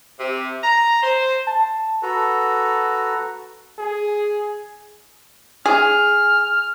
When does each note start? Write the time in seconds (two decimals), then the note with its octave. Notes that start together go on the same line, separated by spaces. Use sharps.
0.19 C3
0.63 A#5
1.02 C5
1.47 A5
2.03 F#4 A4 B4 A#5
3.79 G#4
5.66 G#4 F6